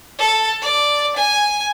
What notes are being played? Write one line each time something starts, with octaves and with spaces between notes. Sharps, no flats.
A4
D5
G#5